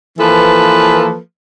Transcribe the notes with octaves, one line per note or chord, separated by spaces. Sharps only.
E3 F3 A#3 A4 B4